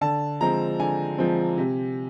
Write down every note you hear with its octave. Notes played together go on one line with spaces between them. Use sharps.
D3 A5
F3 G#3 C4 A#5
D3 G#5
F3 G#3 C4
C3